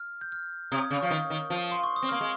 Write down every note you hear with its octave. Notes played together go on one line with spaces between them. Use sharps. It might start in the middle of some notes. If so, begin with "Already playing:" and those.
Already playing: F6
G6
F6
C3 D#6
C#3
F3 C#6
D#3 D#6
D#3
F3
C6
C#6
D#6
C4
A#3 F6
G#3